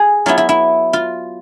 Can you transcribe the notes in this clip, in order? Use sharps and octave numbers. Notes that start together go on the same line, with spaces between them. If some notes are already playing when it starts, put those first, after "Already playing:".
Already playing: G#4
F#3 B3 E4 F4
E4
E4
F4